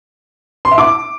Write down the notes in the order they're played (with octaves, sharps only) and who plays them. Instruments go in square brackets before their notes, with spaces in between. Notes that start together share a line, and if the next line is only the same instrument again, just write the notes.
[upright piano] C6
E5
D6